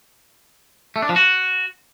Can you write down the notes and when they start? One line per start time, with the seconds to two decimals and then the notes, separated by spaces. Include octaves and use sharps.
0.96 A3
1.02 D4
1.09 F3
1.16 F#4